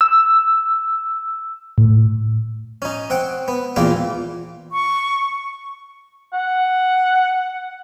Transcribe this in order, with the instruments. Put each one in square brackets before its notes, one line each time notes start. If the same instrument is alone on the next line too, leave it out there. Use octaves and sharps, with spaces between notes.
[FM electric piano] E6
A2
[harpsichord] C#4 D#4
C4 F#5 G5
B3
E2 A#2 E3 A#3 F4 G5
[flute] C#6
[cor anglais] F#5